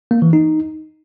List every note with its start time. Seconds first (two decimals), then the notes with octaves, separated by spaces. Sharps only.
0.11 A#3
0.22 E3
0.33 D#4